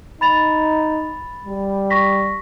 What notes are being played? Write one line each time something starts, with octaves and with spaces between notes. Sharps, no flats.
D#4 B5 A6 F7
G3
C#6 A#6 B6